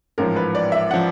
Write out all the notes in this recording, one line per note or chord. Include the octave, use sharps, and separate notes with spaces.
A1 G#2 F3 A#4
B4
D5
E5
F3 F#5